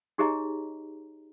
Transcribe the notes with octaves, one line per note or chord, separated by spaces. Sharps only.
D#4 G4 G#4 C#5 D#5 A#5